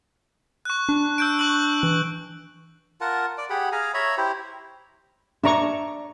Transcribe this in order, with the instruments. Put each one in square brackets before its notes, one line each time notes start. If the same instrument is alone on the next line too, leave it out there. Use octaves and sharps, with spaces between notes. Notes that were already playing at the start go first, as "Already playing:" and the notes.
[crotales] C#6 F#6
[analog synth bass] D4
[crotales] E6 G6 D7
C#6 F#6 F#7
[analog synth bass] E3
[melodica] F4 A#4 F#5 A5
D5
G4 G#4 F#5 B5
G#4 F5 G#5 A#5
C#5 E5 A#5 B5
E4 G4 C5
[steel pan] D4 A#5 C#6 [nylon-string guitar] D5 E5